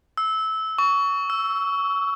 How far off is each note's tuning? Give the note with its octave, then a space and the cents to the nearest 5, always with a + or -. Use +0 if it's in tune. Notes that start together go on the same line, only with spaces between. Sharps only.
E6 -20
C#6 +25
E6 +5